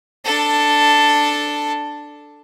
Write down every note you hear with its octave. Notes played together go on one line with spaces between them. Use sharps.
D4 A4